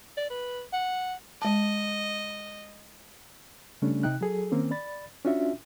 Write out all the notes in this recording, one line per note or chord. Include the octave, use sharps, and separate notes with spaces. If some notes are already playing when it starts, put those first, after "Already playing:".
D5
B4
F#5
G#3 D#5 A5
C#3 G3 A3 C#4 D4
C3 D#4 G5 F#6
F#3 G#4 A4
D#3 A#3 C4 C#4
D5 B5 A6
C#4 D4 F4 F#4 E5